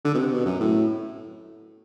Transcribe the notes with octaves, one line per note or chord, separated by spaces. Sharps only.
D3
B2
C3
B2
F#2
A2